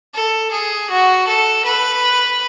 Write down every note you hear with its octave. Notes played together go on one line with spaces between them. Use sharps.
A4
G#4
F#4
A4
B4